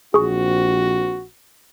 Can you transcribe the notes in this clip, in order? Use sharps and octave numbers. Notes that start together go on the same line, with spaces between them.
A#1 C4 F#4 G#4 C#6